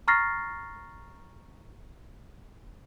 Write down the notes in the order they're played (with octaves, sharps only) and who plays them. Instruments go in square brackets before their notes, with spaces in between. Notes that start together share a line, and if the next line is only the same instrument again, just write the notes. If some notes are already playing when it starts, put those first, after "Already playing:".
[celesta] A#5 C#6 F6 A6 A#6 C7